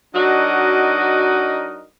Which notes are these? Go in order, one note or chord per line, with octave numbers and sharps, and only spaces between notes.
F#3 D4 D#4 F#4 A#4 D#5